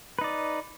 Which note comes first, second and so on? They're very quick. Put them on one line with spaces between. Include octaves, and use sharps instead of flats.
B4 D#4 D5